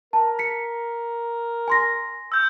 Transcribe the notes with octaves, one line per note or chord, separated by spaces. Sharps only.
A#4 A5
B6 C#7
G#5 C6 A#6
E6 G6